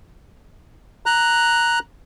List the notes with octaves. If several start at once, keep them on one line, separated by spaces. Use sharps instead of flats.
A#5 F#6